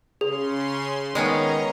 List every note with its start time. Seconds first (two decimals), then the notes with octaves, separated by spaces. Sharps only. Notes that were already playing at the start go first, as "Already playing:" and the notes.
0.21 C#3 C#4 G#4 C6
1.15 D#3 G#3 B3 C#4 C#5 D#5 A#5